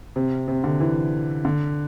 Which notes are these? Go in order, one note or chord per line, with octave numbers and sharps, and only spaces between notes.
C3
C3
D3
E3
D3